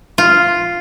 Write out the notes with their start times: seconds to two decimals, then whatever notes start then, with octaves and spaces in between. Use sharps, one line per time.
0.18 F4